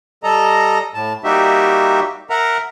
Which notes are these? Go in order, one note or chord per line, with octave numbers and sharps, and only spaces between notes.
G3 A4 D#5 A#5
A2 A5
G3 A#3 D#4 F#4 G4 E5
A#4 E5 F#5 A#5